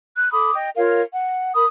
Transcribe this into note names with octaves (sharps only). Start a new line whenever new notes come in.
F#6
A4 B5 D6 D#6
D#5 G5
F4 A#4 C#5 F5
F#5
A#4 B5 D#6